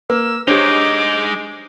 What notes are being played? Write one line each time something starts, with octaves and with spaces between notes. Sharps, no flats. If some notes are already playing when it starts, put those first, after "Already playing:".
A#3 B4 E6
G#3 D4 D#4 G4 C5 C#5 D6